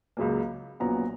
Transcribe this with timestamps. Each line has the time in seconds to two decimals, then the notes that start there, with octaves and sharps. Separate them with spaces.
0.17 C#2 C#3 F#3 A#3
0.80 A#1 A#2 F#3 B3 A#5